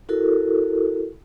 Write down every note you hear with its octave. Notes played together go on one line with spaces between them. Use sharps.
E4 F#4 A4 A#4